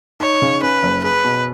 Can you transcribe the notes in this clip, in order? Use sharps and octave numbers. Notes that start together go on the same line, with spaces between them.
D#4 C#5
C#3
C#4 B4
F#1
G#4 B4
B2